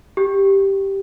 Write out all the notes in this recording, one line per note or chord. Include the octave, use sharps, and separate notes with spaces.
G4